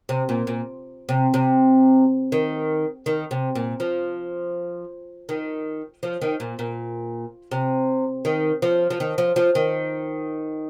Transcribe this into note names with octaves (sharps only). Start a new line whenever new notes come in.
C3
A#2
A#2
C3
C3
D#3
D#3
C3
A#2
F3
D#3
F3
D#3
A#2
A#2
C3
D#3
F3
F3
D#3
F3
F3
D#3